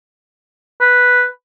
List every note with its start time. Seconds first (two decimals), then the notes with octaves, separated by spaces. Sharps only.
0.81 B4